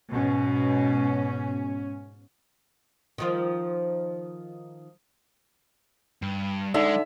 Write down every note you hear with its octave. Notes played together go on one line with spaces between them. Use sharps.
G#2 B2 C#4
D#3 F3 F4
G2
D3 G#3 D#4 E5